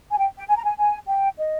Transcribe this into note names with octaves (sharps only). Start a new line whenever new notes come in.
G#5
G5
G5
G#5
A#5
G#5
G#5
G5
D#5